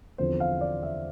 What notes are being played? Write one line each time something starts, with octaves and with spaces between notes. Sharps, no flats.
E2 D3 F3 C4 C5
F5
D5
E5